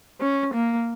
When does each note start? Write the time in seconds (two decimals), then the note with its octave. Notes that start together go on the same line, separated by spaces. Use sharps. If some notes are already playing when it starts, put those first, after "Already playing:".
0.20 C#4
0.54 A#3